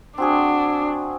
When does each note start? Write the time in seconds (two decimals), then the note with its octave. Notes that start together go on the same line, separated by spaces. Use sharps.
0.18 C4 D4 F#4 G#4